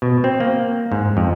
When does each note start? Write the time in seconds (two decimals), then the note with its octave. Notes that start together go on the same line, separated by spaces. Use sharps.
0.02 B2
0.24 C4
0.40 A#3
0.92 G#2
1.17 F2